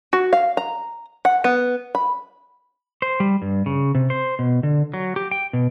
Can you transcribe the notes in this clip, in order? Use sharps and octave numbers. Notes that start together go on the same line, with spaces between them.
F#4
F5
A#5
F#5
B3
B5
C5
G3
G2
C#3
C3
C5
B2
D3
F#3
G4
G5
B2